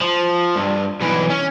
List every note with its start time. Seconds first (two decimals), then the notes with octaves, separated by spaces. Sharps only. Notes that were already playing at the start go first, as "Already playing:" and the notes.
0.01 F3
0.57 G2
1.01 B1 E3
1.30 C#4